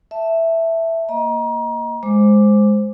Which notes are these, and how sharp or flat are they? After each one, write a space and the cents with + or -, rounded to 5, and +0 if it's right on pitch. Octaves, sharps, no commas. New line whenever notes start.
E5 +0 A5 +0
A#3 +0 D#5 +10 A#5 +30
G#3 +0 C5 +0 D6 +0